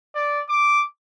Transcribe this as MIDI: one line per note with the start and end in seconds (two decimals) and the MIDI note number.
0.15 0.42 74
0.49 0.84 86